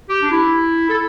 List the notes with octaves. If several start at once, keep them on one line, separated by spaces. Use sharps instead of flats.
G4
D4
E4
A4